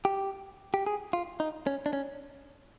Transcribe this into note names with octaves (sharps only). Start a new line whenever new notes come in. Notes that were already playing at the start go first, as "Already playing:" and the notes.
G4
G4
G#4
F4
D#4
C#4
D4
C#4